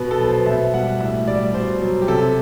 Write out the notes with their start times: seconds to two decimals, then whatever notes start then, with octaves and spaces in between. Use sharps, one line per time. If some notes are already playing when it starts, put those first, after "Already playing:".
Already playing: B2 B4
0.11 A4
0.20 F#3 B4
0.28 C5
0.46 B2 E5
0.73 G3 F#5
1.00 A2 E5
1.27 G3 D5
1.54 B2 C5
1.81 F#3
2.02 G4
2.08 C3 A4